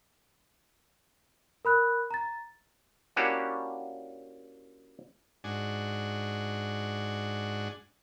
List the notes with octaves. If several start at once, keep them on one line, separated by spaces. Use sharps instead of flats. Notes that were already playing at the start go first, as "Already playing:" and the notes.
A#4 B5 F#6
A#5 A6
A#3 C#4 D4 E4 F#4 G4
G#2 D4 F#4 G#5